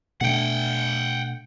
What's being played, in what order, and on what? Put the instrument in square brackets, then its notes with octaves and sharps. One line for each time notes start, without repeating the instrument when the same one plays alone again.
[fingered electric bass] B2 A3 D4 [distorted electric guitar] F#5 G5